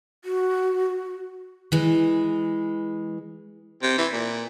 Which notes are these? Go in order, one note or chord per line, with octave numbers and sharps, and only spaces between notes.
F#4
E3 G#3
C3
E3
A#2